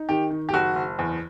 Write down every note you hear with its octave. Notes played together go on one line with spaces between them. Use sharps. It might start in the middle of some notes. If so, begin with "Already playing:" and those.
Already playing: D#4
D#3 G4
D#3
G4
F#1 F#4
F#1
E2